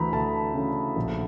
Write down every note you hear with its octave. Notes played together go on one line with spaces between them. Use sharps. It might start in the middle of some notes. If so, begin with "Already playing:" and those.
Already playing: D2 E3 A#5 B5
D2 A5
C#3
A#1